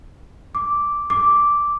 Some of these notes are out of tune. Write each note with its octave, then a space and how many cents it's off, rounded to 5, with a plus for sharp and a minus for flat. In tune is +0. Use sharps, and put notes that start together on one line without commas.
D6 -5
D6 -5